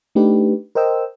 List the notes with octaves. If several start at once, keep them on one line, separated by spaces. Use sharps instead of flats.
A3 D4 D#4 G4 B4
A#4 C5 D#5 G5 E6